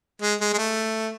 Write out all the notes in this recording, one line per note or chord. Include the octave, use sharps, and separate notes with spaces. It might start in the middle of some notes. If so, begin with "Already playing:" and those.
G#3
G#3
G#3
A3